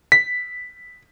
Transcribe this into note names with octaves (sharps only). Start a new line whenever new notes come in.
B6